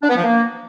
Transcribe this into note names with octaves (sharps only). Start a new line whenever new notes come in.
D4
B3
F3
A#3